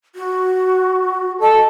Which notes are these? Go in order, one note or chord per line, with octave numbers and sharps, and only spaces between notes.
F#4
A4 D#5